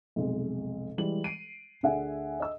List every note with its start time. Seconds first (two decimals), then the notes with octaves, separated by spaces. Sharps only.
0.16 B1 F2 C3 G#3
0.98 E3 G3 G#3 F#7
1.24 C7 D7 D#7
1.83 D2 D4 G#4 E5 F#5 G#5
2.40 D#5 E6